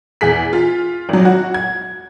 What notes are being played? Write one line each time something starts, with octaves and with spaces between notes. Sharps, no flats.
E2 G#4 B6
F4
G#1 F#3
F#4
G#6